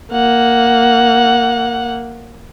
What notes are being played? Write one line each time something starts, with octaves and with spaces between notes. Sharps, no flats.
A#3 F#5